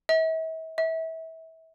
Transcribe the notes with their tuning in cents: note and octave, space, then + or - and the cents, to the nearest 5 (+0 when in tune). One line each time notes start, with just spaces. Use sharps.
E5 -40
E5 -30